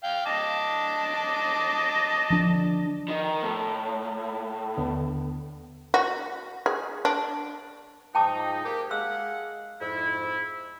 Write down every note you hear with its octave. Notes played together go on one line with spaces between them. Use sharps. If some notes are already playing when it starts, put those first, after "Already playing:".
F5 G5
D#5 A5 D6
F3 D4
D#3
A2
D#2 D3 B3
F#4
G#4
D4
G#2 F3 D#4 G5 A5 D6
A#3 G4
G#3 F5 F#5 E6
F2 G#2 E4